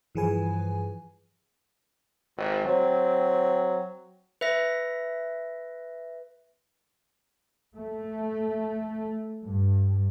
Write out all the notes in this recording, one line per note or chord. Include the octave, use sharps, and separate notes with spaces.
G2 E3 F3 G#4 B4 G#5
G#1
F#3 C4
B4 E5 A#6
A3
G2